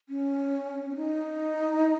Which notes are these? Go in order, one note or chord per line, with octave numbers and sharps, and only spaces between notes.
C#4
C#4
D#4